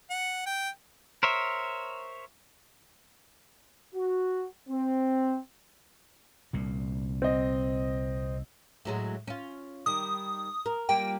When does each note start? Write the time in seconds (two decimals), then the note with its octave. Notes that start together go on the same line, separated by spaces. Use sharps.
0.10 F#5
0.46 G5
1.23 A#4 C5 C#5 E5
3.94 F#4
4.69 C4
6.53 C2 A#2
7.22 C4 D#5
8.85 A2 F#3 G#3
9.27 C#4 F4
9.86 D#3 G3 D#6
10.66 A#4
10.89 G3 A#3 F4 G5